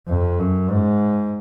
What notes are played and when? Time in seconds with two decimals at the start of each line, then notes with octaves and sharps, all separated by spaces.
0.08 F2
0.39 F#2
0.70 G#2